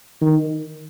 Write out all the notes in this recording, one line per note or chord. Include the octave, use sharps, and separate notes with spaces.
D#3